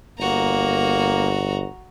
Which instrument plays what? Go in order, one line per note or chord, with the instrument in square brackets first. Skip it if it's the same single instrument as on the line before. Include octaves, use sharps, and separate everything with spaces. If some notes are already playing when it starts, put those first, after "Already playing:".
[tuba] G1 [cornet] A#3 [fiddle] F#4 A#5